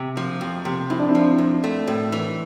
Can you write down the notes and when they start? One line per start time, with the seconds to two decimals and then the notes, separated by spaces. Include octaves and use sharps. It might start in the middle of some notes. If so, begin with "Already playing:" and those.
Already playing: C3
0.17 F3
0.41 F2
0.65 C3
0.90 F2 E4
0.99 D4
1.09 C4 E4
1.15 F3
1.38 F2
1.64 A3
1.87 A2
2.12 E3